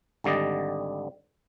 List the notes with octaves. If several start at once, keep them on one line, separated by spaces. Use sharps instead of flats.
G#1 D3 G3 D5 D#5